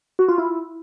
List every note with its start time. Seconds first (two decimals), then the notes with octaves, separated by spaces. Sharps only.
0.19 F#4
0.28 F4
0.38 E4